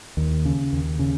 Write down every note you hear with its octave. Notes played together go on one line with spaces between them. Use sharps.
D#2
C#3
D#2
C#3